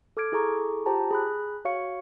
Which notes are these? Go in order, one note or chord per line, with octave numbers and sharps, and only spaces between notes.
A4 D6 F6 G#6 D7
E4 G#4 A4 A#5 C#6 D6
F4 G4 C5 G5 A5 A#5
G#4 B5 F#6
F#4 C#5 F5 C#6 C#7